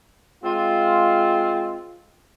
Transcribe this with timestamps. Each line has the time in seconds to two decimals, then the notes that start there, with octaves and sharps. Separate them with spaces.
0.44 G#3 C4 F4